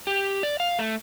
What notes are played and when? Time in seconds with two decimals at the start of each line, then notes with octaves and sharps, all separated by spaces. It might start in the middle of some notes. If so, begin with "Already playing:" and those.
0.07 G4
0.43 D5
0.60 F5
0.79 A3